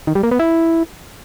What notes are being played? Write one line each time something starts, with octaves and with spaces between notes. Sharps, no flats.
D#3
G3
A#3
B3
E4